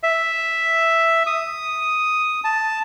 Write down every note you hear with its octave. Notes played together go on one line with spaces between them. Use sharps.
E5
D#6
A5